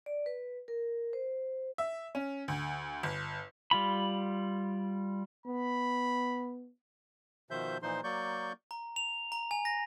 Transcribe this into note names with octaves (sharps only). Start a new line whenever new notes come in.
D5
B4
A#4
C5
E5
C#4
D2
G1
G3 F4 B5
B3 B5
B2 D#3 F3 C5 E5 G6
A#2 E3 F3 D#4 C5 C6
F#3 A#3 D5 C#6 G6
A#5
F7
A#5
G#5
A#6